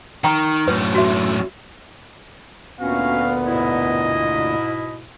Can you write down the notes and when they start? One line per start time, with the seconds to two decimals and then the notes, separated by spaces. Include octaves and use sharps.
0.24 D#3 G5 A#5 C#6
0.68 F#2 A2 B4
0.94 F#4 E5
2.80 D2 A#2 B3 C#4 F#4 F5
3.46 G#2 B2 E4 D#5